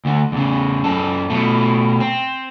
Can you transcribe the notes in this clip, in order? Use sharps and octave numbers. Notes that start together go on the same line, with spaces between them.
D2 D3
E2 C#3
F#2 A4
B2 A3
C4